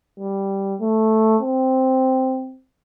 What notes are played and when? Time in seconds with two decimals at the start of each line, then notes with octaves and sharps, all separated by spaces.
0.20 G3
0.81 A3
1.42 C4